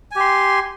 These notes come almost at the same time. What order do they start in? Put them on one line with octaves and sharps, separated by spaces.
G#5 G4 C6